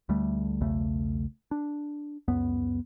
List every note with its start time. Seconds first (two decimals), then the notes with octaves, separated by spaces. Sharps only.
0.09 D2 G3 A3
0.61 B1 E2 C#3 A3
1.51 D4
2.28 C#2 F#2 B3